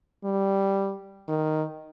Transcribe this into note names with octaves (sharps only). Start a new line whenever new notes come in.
G3
D#3